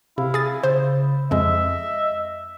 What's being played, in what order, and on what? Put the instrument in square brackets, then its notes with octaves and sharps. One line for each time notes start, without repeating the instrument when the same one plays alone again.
[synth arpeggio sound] C3 [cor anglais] E4 [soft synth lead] F5
[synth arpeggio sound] G#4 A6
[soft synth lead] C#3 [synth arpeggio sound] C5
[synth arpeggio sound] F2 G#3 [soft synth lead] D#5 [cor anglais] E5